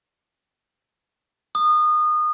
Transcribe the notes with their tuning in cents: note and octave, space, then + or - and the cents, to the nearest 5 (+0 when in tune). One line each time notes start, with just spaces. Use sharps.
D#6 -25